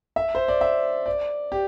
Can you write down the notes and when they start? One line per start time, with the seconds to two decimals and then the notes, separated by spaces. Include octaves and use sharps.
0.16 E5
0.35 C5
0.48 D5
0.61 E5
1.06 D5
1.52 G4